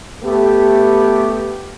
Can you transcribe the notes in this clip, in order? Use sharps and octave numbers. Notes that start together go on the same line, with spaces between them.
A3 B3 G4